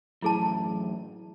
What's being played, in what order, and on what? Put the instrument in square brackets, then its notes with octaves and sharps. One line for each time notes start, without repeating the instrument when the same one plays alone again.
[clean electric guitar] F#2 A2 E3 [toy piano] E4 G#4 A5